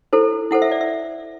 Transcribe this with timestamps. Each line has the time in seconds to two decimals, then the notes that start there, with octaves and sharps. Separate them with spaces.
0.13 E4 A4 C5
0.51 E4 A4 C5 F#5
0.62 E5
0.71 D5
0.81 E5